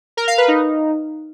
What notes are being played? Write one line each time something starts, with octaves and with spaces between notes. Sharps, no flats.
A#4
F5
B4
D#4